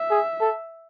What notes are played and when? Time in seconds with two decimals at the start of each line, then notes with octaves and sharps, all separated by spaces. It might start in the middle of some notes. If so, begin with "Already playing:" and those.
Already playing: E5
0.11 G#4
0.40 A4